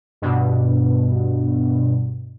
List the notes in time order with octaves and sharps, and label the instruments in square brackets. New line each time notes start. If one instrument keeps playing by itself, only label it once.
[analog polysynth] G2 B2